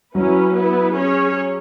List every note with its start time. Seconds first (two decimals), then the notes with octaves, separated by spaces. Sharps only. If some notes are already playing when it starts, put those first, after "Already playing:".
0.15 F#3 C#4 E4 B4
0.54 B3 E4 B4
0.93 C#4 G#4 C#5